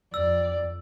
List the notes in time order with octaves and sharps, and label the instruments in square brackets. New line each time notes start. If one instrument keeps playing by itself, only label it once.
[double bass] F2 [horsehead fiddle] D5 [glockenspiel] E6